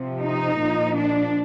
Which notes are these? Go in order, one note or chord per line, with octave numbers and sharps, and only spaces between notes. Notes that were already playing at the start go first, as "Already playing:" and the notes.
Already playing: C3 F3
D#4
A#2 F3
D4